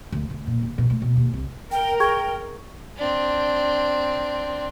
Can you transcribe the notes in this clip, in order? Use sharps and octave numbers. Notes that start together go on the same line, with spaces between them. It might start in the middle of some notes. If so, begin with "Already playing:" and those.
D2
D2
A#2
D#2
B2
A3
B2
D#2
C2
A#4 G5
G#4 G5 C#6 G#6
C4 D4